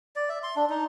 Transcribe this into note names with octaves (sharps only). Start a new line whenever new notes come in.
D5
E5
C6
D4
D#4